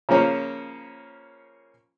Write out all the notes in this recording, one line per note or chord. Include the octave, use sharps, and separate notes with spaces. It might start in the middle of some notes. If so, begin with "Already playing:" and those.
C#3 F3 A#3 C#4